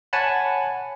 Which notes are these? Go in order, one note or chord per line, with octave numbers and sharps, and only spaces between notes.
C#5 F#5 G#5 A5 B5